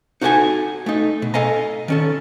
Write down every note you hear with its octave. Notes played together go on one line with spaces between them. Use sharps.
D#4 F#4 A4 C5 F#5 G#5
A3 D#4
B2
A4 D#5 F5 G#5 A#5
D#3 C#4 A4